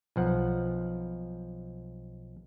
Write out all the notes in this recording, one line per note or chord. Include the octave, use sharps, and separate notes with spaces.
B1 F3 F#5